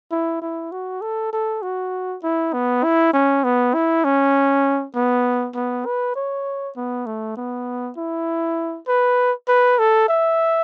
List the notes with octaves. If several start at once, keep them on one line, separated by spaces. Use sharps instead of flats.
E4
E4
F#4
A4
A4
F#4
E4
B3
E4
C#4
B3
E4
C#4
B3
B3
B4
C#5
B3
A3
B3
E4
B4
B4
A4
E5